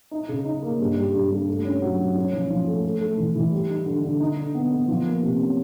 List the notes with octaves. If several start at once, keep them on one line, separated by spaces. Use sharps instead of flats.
D#4
C#3
D#4
A#3
G2
G3
G2
G2
A3
C#4
F#3
F#3
C#4
F3
F3
A3
A3
A3
E3
E3
G3
D#4
D3
D3
D#4
D3
B3
B3
F3
A#3
C3
C#4